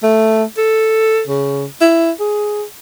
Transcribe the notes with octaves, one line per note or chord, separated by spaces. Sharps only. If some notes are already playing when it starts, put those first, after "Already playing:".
A3
A4
C#3
E4
G#4